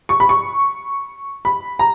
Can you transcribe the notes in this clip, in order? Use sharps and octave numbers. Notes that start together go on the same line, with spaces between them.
C#6
B5
C#6
B5
A#5